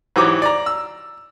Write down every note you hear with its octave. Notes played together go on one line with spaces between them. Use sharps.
G#2 E3 F#3 G4 D6
D5 A#5
E6